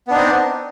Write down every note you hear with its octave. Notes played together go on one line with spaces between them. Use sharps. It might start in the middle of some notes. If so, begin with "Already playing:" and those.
B3 C4 D4 D#4